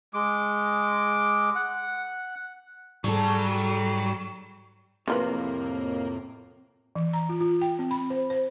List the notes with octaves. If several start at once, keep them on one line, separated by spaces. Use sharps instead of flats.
G#3 D6
F#5
G#2 F#3 G3 G#4 A4
F2 A2 C3 E3 A#3 F4 B4
E3
A#5
F4
F4
G5
C4
B5
C5
C5